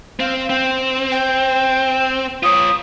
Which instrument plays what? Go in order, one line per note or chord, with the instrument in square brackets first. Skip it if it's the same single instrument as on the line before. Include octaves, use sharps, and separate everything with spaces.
[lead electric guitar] C4 [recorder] F5
[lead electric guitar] C4 [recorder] G5
[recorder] G5
[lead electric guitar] F4 C#5 [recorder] D#6